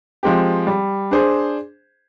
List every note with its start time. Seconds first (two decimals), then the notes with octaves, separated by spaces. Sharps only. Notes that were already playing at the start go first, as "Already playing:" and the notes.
0.23 F3 G#3 C4 G4
0.67 G3
1.11 D4 G#4 C5